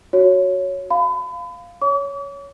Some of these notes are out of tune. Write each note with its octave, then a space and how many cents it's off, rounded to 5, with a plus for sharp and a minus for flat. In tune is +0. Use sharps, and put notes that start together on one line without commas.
F#4 +0 C#5 +0
F5 +0 B5 +35
C#5 +10 D6 -45